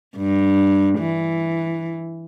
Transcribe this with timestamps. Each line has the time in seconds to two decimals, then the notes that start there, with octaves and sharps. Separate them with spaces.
0.17 G2
0.99 E3